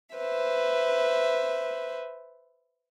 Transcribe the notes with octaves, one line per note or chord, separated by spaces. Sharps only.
B4 C5 E5